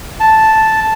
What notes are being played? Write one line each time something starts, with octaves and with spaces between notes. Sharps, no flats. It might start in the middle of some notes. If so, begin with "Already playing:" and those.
A5